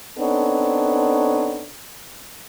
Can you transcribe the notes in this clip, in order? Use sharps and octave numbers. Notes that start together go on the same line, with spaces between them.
B3 C4 D4 D#4 A4 C#5